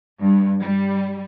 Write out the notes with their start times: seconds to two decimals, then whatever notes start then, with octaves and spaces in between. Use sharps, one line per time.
0.21 G2
0.60 G3